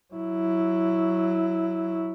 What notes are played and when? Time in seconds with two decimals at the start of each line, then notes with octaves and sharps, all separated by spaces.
0.14 F#3 E4